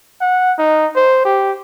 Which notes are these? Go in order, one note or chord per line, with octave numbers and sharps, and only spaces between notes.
F#5
D#4
C5
G4